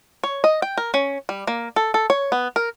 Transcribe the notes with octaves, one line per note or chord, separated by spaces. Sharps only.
C#5
D#5
G5
A#4
C#4
G3
A#3
A4
A4
C#5
B3
A#4